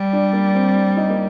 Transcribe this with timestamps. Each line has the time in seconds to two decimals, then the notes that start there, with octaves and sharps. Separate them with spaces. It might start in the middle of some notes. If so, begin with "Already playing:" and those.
Already playing: G3
0.13 D4
0.33 A#3
0.55 C4
0.75 D4
0.97 D#4
1.10 A#3